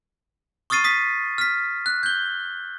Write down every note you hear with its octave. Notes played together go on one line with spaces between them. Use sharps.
C#6 D#6 F6 A6 C7 D#7
D#6 B6
F6 B6
F#6
G6 G7